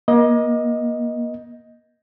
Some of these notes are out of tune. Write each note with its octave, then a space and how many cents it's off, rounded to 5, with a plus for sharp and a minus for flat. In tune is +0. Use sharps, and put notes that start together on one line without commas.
A#3 +35 D#5 +10